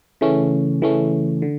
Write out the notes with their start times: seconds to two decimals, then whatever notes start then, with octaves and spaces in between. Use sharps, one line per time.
0.21 C#3 E3 A3 C#4
0.82 C#3 E3 A3 C#4
1.42 D3